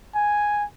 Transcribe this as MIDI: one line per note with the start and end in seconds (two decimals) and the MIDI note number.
0.15 0.65 80